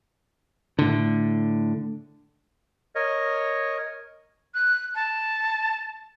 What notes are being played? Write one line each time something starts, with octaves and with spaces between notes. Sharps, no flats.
A2 D3
A#4 C#5 D#5
F#6
A5